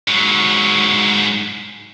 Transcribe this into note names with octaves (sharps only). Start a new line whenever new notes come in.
G#2 F#3